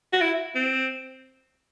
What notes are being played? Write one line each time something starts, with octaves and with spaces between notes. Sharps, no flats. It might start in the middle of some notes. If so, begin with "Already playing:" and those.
F#4
E4
C4